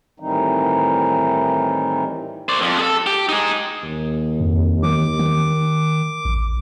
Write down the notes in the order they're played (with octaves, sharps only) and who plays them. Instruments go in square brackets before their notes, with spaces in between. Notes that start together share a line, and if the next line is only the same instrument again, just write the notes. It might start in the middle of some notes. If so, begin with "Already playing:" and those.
[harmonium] A2 D#3 E3 G3 C4 D#4
[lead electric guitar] C5 D5
F2
G#4 A4
G4
D#4 G#4
[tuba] D#2
[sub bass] F2
[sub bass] D#3 [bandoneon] D6
[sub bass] D#3
A1